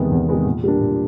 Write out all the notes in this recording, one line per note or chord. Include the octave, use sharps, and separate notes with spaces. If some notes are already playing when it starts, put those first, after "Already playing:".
Already playing: E2 C3 D#3 G#3 B3
E2
C3 D#3 G#3 B3
A#2
G3 A#3 D4
A#2